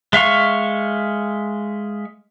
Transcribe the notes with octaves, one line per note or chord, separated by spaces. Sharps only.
G#3 E5 F5 C#6